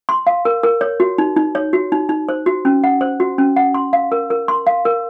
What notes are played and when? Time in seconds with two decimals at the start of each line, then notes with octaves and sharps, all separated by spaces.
0.09 C6
0.27 F5
0.45 A#4
0.63 A#4
0.81 C#5
1.00 F#4
1.18 D#4
1.36 D#4
1.55 C#5
1.73 F#4
1.92 D#4
2.09 D#4
2.29 C5
2.46 F#4
2.65 C#4
2.84 F#5
3.01 C5
3.20 F#4
3.38 C#4
3.56 F#5
3.74 C6
3.93 F5
4.12 A#4
4.30 A#4
4.48 C6
4.67 F5
4.85 A#4